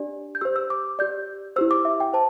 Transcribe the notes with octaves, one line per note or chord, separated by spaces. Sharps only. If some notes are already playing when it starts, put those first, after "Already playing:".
Already playing: D4 G4 D5
G6
G4 C5 E6
E6
D6
G4 D5 G6
E4 G4 C5 E6
D6
E5
G5
C5 A5